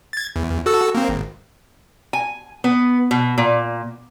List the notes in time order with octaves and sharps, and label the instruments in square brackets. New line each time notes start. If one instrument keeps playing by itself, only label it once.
[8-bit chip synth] G#6 A6
E2
F#4 A4 E6
A#3 C4
G#1
[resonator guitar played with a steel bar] G#5
B3
B2
A#2